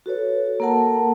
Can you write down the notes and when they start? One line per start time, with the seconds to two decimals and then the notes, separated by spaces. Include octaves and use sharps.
0.06 F#4 A4 B4 C#5
0.60 A#3 A4 A#4 F#5 A5